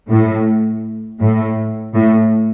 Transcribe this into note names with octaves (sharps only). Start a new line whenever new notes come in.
A2
A2
A2